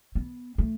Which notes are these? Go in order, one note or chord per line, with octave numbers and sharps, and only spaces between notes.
B3
A3